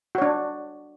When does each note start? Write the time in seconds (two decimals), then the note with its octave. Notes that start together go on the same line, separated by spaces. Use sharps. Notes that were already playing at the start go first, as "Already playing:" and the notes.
0.15 F#4
0.18 C#5
0.22 D4